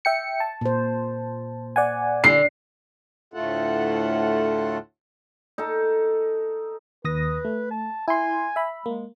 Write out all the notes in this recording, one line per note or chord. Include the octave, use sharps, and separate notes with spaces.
E5 G5 C#7
A5
A#2 C5
D5 F#5 G#5
D3 C7
D2 A2 A3 F4 A4 F#5
D#4 A4
D#2 B4 D#6 A#6
A3
A5
E4 G#5 C6
E5 B5
G#3 A#3